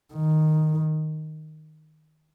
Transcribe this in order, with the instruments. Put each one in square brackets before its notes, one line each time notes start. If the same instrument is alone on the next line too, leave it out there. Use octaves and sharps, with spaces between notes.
[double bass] D#3